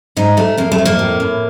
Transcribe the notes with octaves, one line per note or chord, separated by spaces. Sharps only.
G#2 D#4
G#2 A3
F2 A#3
A3
F2
A#3
A2
A2